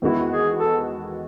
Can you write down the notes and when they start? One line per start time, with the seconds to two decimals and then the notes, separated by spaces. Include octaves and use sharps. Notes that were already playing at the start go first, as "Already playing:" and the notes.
0.02 E2 D#3 G#3 B3 E4 F#4
0.30 G#4
0.57 A4